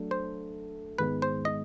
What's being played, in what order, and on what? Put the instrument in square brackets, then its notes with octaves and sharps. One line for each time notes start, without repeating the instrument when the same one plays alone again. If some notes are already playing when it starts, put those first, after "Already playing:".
Already playing: [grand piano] F#3 A3 D4
[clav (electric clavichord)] C5
[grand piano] G#2 D#3 G#3 B3 [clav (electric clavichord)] B4
[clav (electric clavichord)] C5
D#5